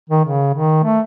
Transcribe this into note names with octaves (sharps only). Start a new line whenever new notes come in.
D#3
C#3
D#3
A3